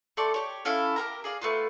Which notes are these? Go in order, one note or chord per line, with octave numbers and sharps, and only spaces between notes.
A3 A4 D5 C6
G4 C#5
C#4 E4 A4 F5
G4 A#4 A#5
G#4 D5 F5
A3 B3 F4